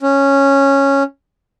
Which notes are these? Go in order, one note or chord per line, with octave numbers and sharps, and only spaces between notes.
C#4